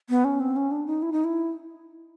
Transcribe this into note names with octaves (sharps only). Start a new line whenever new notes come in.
B3
C#4
C4
C#4
D4
D#4
E4
D#4
E4